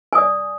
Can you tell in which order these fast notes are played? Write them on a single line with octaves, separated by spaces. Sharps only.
G#5 D#6 D5